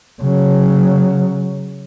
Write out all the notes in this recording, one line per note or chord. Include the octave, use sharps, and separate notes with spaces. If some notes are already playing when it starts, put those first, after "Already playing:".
C#3 F#3